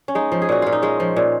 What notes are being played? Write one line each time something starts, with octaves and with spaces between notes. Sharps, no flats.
C#4
G#3 D#4
F3
G#4
A#2 F#4
A#2 F4
D#4
G#3 C#4
F3
A#2